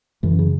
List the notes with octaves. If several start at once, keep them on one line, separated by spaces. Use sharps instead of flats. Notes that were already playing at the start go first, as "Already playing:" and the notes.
F#2 D3 E3
C#3